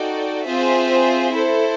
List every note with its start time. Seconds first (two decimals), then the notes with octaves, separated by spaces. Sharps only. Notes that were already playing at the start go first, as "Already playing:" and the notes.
Already playing: D#4 F#4 A4 D5 G5
0.46 C4 F4 G#4 C5 E5
1.33 E4 A4 C5